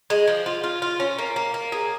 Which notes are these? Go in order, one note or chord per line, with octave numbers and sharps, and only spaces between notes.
G#3
F3
F4
F4
F4
C#4
A#3
A#3
A#3
G#4